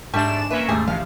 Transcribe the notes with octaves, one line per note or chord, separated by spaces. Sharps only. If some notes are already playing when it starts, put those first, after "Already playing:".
G#2 G3 A3 D4 E5 E7
A#3 C#4 B4 E5
D#2 G#2 G3 A3 G#4
A1 C3 F3 F5